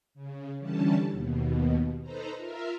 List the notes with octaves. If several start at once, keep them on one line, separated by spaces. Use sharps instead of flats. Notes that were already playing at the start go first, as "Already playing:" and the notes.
C#3
D3 E3 G3 C#4 A5
D#2 B2
D#4 A4 B4 C5 A#5
F4 A#4 E5 F5